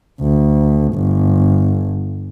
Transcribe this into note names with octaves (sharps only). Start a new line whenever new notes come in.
D2
G1